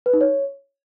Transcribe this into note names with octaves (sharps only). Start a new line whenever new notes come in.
B4
D#4
C#5